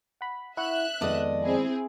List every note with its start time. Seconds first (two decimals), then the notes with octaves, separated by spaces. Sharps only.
0.21 F#5 B5
0.57 E4 E5 F#5 C#6 F#6
1.01 F2 D#3 G#3 B3 D5 D#5
1.45 C4 E4 G#4